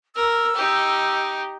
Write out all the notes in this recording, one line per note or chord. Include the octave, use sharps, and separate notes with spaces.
A#4 E6
D#4 G4